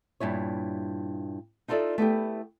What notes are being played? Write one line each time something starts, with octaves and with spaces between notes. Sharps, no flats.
G2 A#2 E4 C#5
D#4 F4 A4 B4 D5 E5
A3 B3 E4 G4